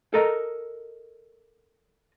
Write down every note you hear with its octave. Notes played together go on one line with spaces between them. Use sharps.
A4 A#4 D#5 A#5